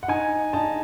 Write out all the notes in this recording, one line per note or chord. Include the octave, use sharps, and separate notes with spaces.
F#5
D#4 G#5
D#4 A5